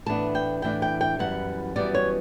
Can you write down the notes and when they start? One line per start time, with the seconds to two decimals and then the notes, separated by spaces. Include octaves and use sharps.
0.06 A2 E3 B3 D4 A5
0.35 G5
0.62 A2 E3 B3 D4 G5
0.82 G5
1.01 G5
1.19 F#2 E3 G3 B3 F#5
1.76 F#2 E3 G3 B3 D5
1.95 C#5